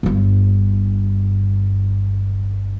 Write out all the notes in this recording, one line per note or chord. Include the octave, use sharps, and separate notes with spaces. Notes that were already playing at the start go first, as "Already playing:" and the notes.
G1 G2